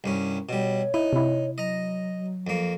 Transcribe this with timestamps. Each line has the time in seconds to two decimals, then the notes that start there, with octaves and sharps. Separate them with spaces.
0.04 C2 G2 C#4
0.49 B2 G3 C#5
0.94 D#4 E4
1.12 C3 E4
1.58 F#3 D#5 A#5
2.47 F2 A#3